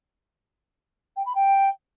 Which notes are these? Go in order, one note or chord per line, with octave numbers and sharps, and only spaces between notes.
G5
B5
G5